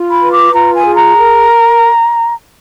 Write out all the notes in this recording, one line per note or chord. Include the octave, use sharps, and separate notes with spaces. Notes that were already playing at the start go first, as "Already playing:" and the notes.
Already playing: F4
B5
B4
D6
F4 A#5
G#5
G#4
A#5
A#4